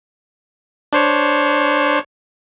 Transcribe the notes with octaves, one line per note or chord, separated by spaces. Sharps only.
D4 C5 C#5